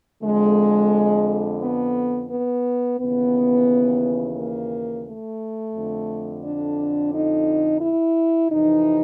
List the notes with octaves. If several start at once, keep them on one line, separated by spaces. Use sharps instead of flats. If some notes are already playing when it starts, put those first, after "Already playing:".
F2 D3 G#3
B3
B3
D#2 C#3 E3 B3
A#3
A3
F2 D3
D4
D#4
E4
F2 C3 E3 D#4